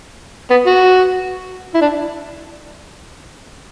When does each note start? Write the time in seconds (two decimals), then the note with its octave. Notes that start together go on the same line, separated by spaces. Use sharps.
0.51 B3
0.67 F#4
1.74 E4
1.81 D4